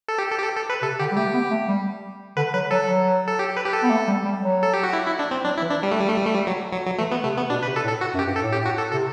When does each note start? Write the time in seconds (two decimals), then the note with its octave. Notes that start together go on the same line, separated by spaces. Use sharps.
0.08 A4
0.18 G4
0.31 A4
0.39 G4
0.44 A4
0.57 A4
0.70 B4
0.82 C3 A4
0.99 D3 G4
1.11 G3
1.17 A3 G4
1.33 B3
1.51 A3
1.68 G3
2.37 D3 B4
2.54 F#3 B4
2.71 F#3 A4
2.88 F#3
3.28 A4
3.39 G4
3.57 B4
3.65 G4
3.73 A4
3.83 B3
3.90 A3
4.07 G3
4.25 G3
4.41 F#3
4.63 A4
4.74 G4
4.83 F#4
4.93 E4
5.06 E4
5.19 D4
5.31 C4
5.44 F#3 D4
5.58 E4
5.62 E3
5.71 D4
5.83 G3
5.92 A3
6.00 G3
6.08 A3
6.17 G3
6.25 A3
6.34 G3
6.47 F#3
6.73 F#3
6.86 F#3
6.99 E3 A3
7.11 B3
7.24 C3 A3
7.37 B3
7.50 B2 D4
7.63 B4
7.67 C3
7.76 A4
7.84 A2
7.88 A4
8.01 F#4
8.14 F#2
8.19 G4
8.26 G2
8.36 A4
8.40 A2
8.53 G4
8.65 F#4
8.78 A4
8.91 C3 A4